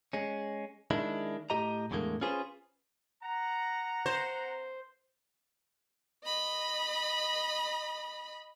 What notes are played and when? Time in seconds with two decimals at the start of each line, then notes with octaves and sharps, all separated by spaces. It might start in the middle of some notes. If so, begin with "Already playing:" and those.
0.13 G#3 C#4
0.91 D#3 G#3 D4 E4
1.50 A2 G4 D#5 A#5
1.91 E2 A2 D3 G#3 A#3
2.21 C#4 F4 G#4 B4 C5
3.23 F#5 A#5
4.06 C5
6.25 D#5 B5